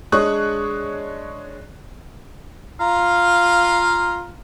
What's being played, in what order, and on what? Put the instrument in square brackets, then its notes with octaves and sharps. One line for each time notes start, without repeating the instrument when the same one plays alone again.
[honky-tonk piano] G#3 D4 C#5 C#6 D#6 F#6
[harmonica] F4 F5 A#5